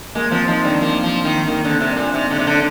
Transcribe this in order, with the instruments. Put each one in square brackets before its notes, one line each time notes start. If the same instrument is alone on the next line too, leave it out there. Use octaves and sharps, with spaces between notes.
[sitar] G#3 [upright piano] A#3
[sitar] F3 [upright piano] C4
[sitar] F3 [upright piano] D#4
[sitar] D#3 [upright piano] D4
[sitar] F3 [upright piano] A#3
[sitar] F3
D#3
[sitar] D#3 [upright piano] A#3
[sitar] D3
[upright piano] C4
[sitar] C3
[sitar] A#2 [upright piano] D4
[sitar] C3 [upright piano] D#4
[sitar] D3 [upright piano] D4
[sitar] C3
[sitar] D3 [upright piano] D4